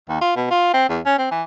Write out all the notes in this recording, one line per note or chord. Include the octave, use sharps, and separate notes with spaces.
D#2
F4
B2
F4
C4
E2
C#4
C4
E3